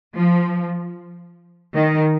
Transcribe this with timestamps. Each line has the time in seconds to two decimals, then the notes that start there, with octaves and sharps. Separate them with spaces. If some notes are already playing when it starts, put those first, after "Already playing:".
0.15 F3
1.76 D#3